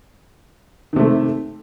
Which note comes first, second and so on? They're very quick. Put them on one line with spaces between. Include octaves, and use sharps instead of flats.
D#3 C3 A3